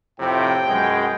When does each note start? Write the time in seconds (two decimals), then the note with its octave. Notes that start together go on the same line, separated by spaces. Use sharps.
0.20 F2 A2 C3 G5
0.68 F#2 B2 G#3